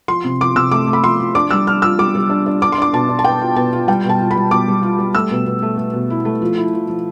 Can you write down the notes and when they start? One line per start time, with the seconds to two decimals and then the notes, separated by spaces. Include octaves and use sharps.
0.08 F3 C6
0.24 C3
0.41 F3 D6
0.56 C3 E6
0.71 A3 D6
0.87 A3
0.93 B5
1.03 F3 C6
1.20 F3
1.35 D4 D6
1.51 G3 E6
1.67 D4 F6
1.82 F4 E6
1.99 G3 D6
2.15 G3
2.30 D4
2.47 D4
2.62 D4 D6
2.72 C6
2.78 D4 D6
2.93 B2 A5
3.09 D4
3.19 A5
3.24 B3 G5
3.41 F4
3.56 B2 A5
3.73 F4
3.88 G3 G5
4.04 B2 A5
4.21 F4
4.31 B5
4.36 G3
4.51 B2 D6
4.68 G3
4.83 F4
4.99 G3
5.15 A3 E6
5.31 B2
5.46 B2
5.62 A3
5.77 A3
5.93 B2
6.10 E4
6.25 A3
6.42 F3
6.58 E4
6.73 F3
6.88 F3